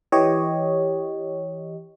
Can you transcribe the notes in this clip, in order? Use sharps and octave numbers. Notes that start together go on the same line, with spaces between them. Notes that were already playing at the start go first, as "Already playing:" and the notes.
E3 G4 C#5 D#5